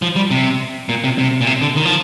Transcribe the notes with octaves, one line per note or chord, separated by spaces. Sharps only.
F3
G3
C3
A#2
C3
C3
A#2
C3
D3
D#3
F3